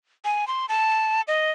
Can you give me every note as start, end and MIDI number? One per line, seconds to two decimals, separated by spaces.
0.25 0.47 80
0.47 0.66 84
0.69 1.21 81
1.28 1.51 75